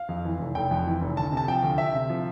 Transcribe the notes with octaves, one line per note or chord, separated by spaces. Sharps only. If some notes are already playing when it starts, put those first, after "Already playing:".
Already playing: F5
F2
E3
F1
F1 G5
F2
E3
F1
D2 A5
C3 A5
F3 G5
D2
D2 E5
C3
F3